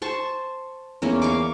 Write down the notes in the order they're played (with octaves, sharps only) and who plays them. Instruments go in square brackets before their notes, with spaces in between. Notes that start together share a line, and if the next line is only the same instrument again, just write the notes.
[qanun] C5 A5 C#6
[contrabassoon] E2 [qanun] A#3 C#4 A#4
[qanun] F5 C#6 D6